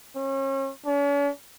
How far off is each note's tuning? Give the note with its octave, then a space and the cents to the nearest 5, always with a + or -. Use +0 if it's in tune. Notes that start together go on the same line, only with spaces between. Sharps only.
C#4 -35
C#4 +45